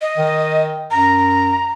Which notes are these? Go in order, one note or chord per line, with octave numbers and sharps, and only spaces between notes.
D#5
D#3
F#2 A#5